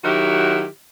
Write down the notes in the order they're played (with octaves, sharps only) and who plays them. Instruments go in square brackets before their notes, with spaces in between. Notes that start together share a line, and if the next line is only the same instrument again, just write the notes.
[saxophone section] D#3 F#3 E4 F#4 G4